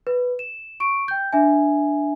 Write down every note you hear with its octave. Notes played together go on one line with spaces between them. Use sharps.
B4
E7
C#6 D7
G5 G6
D4 E5 G#5